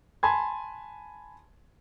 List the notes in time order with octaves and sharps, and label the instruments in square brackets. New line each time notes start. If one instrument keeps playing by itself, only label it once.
[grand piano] G#5 A5 B5 C6 G#6